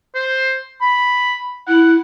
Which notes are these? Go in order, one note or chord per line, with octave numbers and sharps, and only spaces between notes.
C5
B5
E4 F#5